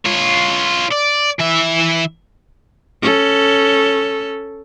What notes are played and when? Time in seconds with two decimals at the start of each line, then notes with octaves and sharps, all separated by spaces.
0.05 F4 C#5
0.92 D5
1.40 E3 E5
3.02 C#4 A4